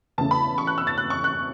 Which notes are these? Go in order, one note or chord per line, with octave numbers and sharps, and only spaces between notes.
E2 C#3 A3 A5
B5
C#6
F#6
E6
A6
F#6
C#6
F#6